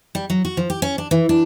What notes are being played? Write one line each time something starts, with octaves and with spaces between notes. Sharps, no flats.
G3
F#3
F#4
F3
G4
C#4
D4
E3
D4